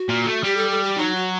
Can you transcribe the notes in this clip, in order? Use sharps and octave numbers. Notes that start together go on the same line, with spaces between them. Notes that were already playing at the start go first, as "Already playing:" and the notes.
Already playing: F#4
A#2
A3
G3 G4
A4
A4
G4
F#3 D#4
F#4